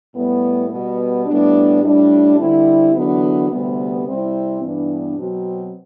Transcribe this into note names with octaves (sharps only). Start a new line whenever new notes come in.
A2 G3 B3
B2 G3 B3
A2 G3 B3 D4
A2 G3 D4
D3 G3 C4 E4
E2 D3 F#3 B3 D4
D2 C3 G3 B3
C3 G3 C4 E4
G2 E3 B3 D4
B2 F#3 C4